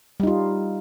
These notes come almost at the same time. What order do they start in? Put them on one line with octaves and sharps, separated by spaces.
G3 D#4 F4